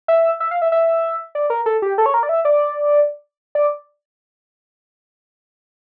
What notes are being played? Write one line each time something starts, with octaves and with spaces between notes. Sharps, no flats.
E5
E5
F5
E5
E5
D5
A#4
A4
G4
A4
C#5
A#4
D5
E5
D5
D5